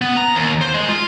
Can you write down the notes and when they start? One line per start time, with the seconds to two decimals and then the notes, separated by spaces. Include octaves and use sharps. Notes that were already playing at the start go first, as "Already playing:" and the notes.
0.02 B3
0.17 A#5
0.35 D#2
0.61 C5
0.74 G#3
0.89 F4